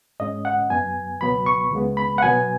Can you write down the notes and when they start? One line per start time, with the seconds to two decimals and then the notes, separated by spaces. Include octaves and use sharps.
0.20 G#2 G#3 C#4 D#5
0.45 F#5
0.70 F#2 F#3 B3 G#5
1.21 C#2 B2 F#3 B3 B5
1.46 C#6
1.72 C#2 C#3 G#3 B3
1.97 B5
2.18 F#5
2.22 B2 F#3 B3 G#5